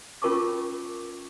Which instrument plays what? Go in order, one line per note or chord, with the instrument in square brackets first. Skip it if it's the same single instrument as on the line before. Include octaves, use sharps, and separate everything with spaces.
[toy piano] C#4 F4 A#4 A5 C#6 D6